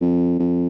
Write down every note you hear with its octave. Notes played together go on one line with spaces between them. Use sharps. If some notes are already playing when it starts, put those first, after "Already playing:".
F2
F2